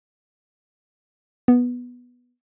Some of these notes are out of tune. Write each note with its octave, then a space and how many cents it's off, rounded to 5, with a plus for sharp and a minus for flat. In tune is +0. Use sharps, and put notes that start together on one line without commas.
B3 -10